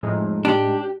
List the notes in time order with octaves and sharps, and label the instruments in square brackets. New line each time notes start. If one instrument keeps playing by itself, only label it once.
[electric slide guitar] F2 [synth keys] A2 G#3 D#4
[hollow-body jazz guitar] D4 [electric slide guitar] G4